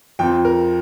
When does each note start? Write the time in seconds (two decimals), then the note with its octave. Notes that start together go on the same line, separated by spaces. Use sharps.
0.19 F2 F3 C4 G5
0.45 A#4